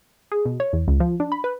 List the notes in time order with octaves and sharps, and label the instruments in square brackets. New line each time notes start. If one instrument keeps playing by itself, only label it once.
[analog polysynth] G#4
B2
C#5
E2
C#2
F3
D4
B5
B4